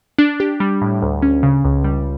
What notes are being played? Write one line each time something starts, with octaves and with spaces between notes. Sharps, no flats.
D4
G4
G3
A2
D2
C#4
C#3
C#2
G3